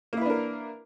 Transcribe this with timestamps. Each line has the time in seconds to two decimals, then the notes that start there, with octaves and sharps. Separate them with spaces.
0.13 A#3
0.17 E4
0.21 B4
0.26 D4
0.30 A#4